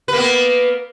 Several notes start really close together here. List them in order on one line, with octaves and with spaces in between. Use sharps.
B4 A#3 B3